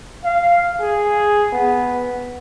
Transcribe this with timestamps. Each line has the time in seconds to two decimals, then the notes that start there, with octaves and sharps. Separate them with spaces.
0.24 F5
0.80 G#4
1.52 B3